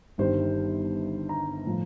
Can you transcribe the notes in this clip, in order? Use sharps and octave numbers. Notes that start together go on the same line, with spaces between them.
G1 G2 D#3 G3 C5
A#5
A2 F3